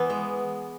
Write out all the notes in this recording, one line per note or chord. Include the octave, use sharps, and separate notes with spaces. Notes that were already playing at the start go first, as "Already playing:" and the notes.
Already playing: E3 B3
G#3